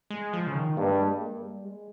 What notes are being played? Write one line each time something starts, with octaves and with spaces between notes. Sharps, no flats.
G#3
F3
C#3
D#3
G2 A#3
G#3
G3
G#3
A#3
G3
G#3